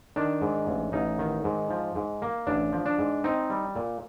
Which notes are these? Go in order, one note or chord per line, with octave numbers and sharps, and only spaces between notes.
D#3 D4
G#2
A1
A1 D#4
D#3
G#2
F3
G#2
A#3
A1 D4
F3
D4
G#2
C4 D#4
G3
A#2